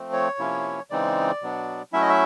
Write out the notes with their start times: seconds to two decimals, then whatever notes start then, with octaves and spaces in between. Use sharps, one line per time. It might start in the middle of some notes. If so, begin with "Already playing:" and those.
Already playing: F3 A3 C4
0.13 C#5
0.38 C3 F3 A#3 C#4 E4
0.90 C#3 E3 G#3 C4 D#4 D5
1.42 B2 F#3 B3 D4
1.92 F#3 A3 C#4 E4 E5
2.02 D#5
2.09 E5